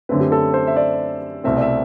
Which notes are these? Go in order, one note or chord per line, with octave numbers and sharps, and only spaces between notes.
F#2 D3 A3 C4 B4
G4
A4
C5
E5
D5
C2 B2 A3 C4 E5
D5
E5